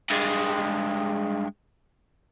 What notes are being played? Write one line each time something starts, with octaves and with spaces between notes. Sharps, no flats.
G2 G#3